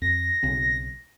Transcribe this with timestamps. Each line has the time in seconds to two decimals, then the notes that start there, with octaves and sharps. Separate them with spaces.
0.02 F2 A#6
0.43 B1 C#3 C4